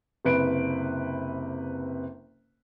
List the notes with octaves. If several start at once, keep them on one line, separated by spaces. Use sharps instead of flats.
F#1 C3 B4 D7